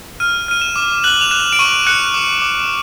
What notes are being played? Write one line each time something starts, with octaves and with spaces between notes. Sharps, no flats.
F6 D#7
F6 D#7
E7
D6
F#6 F#7
F7
F#6 E7
D7
C#6 D#7
F#6 C#7
D6
D6